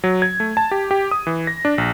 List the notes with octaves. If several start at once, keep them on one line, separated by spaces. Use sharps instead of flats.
F#3
G#6
A3
A5
G4
G4
D#6
E3
A#6
D4
A#1